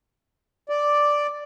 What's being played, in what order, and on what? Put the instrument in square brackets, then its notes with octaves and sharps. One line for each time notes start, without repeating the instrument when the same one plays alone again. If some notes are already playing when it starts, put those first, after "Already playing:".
[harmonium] D5